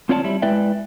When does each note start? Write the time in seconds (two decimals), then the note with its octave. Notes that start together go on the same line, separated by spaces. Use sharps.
0.09 C4 F4 C#5 D5 E5 A5
0.24 G3 E4
0.42 G#3 E4 B4 D5 E5 G5